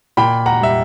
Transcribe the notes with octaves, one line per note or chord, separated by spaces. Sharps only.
A#2 G5 B5
F#5 A#5
G3 E5